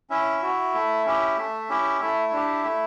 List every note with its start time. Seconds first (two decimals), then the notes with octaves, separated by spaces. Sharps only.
0.10 C#4 E4 E5
0.42 F#4
0.74 A3
1.05 C#4 E4 G4
1.37 A3
1.69 C#4 E4 G4
2.00 A3 E4 E5
2.32 D4 G4
2.64 A3